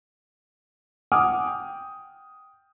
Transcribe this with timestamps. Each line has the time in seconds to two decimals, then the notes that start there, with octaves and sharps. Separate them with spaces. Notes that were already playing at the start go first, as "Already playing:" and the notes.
1.12 F#5 G#5 D6 D#6 F6
1.47 G5